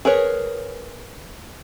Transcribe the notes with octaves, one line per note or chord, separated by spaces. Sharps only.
G#4 A#4 B4 C#5